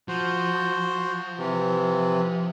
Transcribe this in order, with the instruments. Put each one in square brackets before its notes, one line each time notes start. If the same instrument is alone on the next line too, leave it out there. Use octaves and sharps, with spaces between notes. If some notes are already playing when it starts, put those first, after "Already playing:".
[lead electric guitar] F3 [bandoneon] F#4 C5
[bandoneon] C3 E3